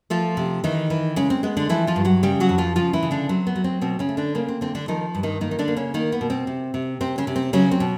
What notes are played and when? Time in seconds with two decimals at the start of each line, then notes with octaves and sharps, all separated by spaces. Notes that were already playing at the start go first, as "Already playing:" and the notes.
0.10 F3 A3 F4
0.37 C3
0.64 D#3 E3 D#4
0.90 E3
1.16 C#3 G#3 C#4
1.30 C4
1.43 G#3 B3
1.57 D3 D4
1.69 E3 F3 E4
1.87 F3 F4
1.96 G2
2.05 F#3 F#4
2.23 C#3 G3 G4
2.40 F#3 F#4
2.49 F2
2.58 F3 F4
2.76 C#3 F3 F4
2.93 E3 E4
3.03 C#3
3.11 D3 D4
3.29 F#3 C4
3.47 B3
3.55 F#3
3.64 C4
3.81 B2 C4
3.99 C#3 C#4
4.09 A3
4.17 D3 D4
4.35 C#3 A#3 C#4
4.48 C4
4.61 D3 C4
4.75 D3 D4
4.88 D#3 F3 D#4
5.15 G2
5.23 D#3 D#4
5.41 D#3 A#3 D#4
5.51 D#4
5.59 D3 D4
5.68 A#3
5.77 C#3 C#4
5.94 D#3 A#3 D#4
6.12 B3
6.21 B2
6.30 C4
6.47 C3
6.74 C3
7.01 C3 C4
7.18 C#3 C#4
7.27 C3
7.36 C4
7.53 C#3 F#3 C#4
7.71 C4
7.80 B2